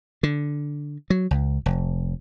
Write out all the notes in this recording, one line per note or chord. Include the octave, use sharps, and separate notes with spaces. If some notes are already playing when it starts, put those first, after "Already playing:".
D3
F#3
C#2
F1